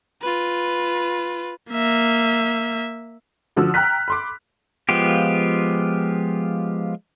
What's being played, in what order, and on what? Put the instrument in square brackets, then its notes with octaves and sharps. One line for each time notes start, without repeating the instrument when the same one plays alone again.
[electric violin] F4 B4
A#3 E5
[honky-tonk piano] D3 F3 F#4 E6
G5 A#5 F6 F#6 B6
B5 C6 D6
[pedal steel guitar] F3 G#3 B3 F4 G4